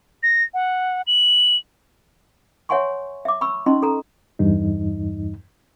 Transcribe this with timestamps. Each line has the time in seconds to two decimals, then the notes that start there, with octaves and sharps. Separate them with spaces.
0.23 A#6
0.54 F#5
1.07 F#7
2.69 C#5 E5 F#5 G#5 C6 C#6
3.25 E5 D6
3.41 B5 C#6 E6
3.66 C#4 D#4 D#5 C6
3.83 A4 A#5
4.39 E2 G2 D#4